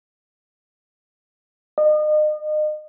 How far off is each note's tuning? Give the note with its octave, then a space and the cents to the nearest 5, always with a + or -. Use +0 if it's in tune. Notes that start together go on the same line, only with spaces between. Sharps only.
D#5 -35